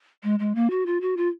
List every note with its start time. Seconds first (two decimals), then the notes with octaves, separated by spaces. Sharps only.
0.23 G#3
0.39 G#3
0.55 A#3
0.70 F#4
0.86 F4
1.01 F#4
1.17 F4